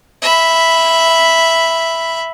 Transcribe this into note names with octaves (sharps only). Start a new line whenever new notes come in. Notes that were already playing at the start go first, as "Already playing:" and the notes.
E5 B5